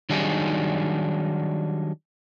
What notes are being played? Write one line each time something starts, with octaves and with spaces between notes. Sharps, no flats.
D#3 F#3 G3 D4 D#4 G#4